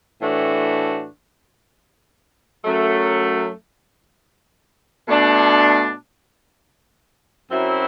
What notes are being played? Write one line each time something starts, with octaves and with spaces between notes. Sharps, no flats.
A2 E3 A3 D4 F#4
F#2 F#3 A3
B2 A3 D4
F#2 F#3 C4 E4